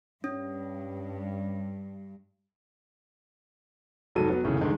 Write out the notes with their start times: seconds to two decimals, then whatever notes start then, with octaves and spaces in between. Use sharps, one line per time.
0.24 G2 C#4
4.15 F1 G#2 F#3 A4 D#7
4.29 F#3 B3
4.44 F1 D#2 A2 C#3
4.61 C2 G#2 D3 D#3 G#3